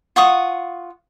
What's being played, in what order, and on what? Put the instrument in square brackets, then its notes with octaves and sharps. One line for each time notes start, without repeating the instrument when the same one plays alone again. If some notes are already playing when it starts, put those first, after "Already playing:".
[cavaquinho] F4 F#5 C#6 D#6